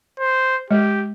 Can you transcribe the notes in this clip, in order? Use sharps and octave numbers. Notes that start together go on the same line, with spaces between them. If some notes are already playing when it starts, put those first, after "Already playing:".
C5
G#3 G4